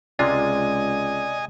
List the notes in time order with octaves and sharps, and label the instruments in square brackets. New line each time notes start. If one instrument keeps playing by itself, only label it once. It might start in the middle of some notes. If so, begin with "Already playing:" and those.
[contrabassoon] C#2 [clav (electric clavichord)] C3 G#3 F4 [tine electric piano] D5 [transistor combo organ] D#5 G#5